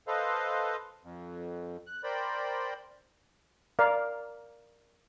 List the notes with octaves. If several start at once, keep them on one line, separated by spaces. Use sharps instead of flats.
A4 B4 C5 D#5 F5
F2
F#6
A#4 C5 D5 G5 B5
A#4 D5 F5